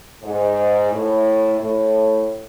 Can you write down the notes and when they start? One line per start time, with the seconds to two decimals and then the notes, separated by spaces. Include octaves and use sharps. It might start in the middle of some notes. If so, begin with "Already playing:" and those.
0.23 G#2
0.92 A2
1.59 A2